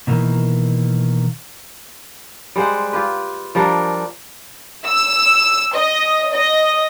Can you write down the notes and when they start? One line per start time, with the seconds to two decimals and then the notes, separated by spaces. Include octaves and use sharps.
0.07 B2 D#3 E3 A#3
2.56 G3 G#3 C5 F#5
2.93 F4 G4 B4
3.55 F3 G3 D4 A#4
4.86 E6
5.75 D#5
6.34 D#5